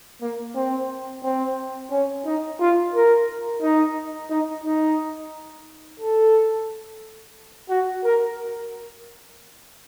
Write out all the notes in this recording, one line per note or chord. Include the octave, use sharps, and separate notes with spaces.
A#3
C4
C4
C#4
D#4
F4
A#4
D#4
D#4
D#4
A4
F#4
A#4